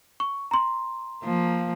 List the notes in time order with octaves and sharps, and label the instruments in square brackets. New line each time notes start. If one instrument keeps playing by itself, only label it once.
[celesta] C#6
A#5 C6
[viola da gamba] F3 A#3